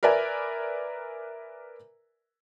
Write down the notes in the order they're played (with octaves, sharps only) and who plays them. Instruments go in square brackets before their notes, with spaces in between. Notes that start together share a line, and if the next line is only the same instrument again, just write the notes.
[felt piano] A#4 B4 D5 E5 G#5